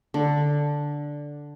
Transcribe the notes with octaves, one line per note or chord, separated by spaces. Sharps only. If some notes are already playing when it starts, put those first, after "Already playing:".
D3